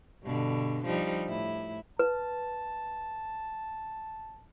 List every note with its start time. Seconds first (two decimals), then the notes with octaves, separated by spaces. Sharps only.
0.24 G2 B2 D3
0.86 F3 G3 D#4
1.27 A2 E4
1.99 B4 A5